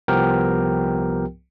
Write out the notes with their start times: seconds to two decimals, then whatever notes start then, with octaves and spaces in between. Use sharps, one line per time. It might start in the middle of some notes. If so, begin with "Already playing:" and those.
0.08 C2 F3 B3 G4 A#4 G5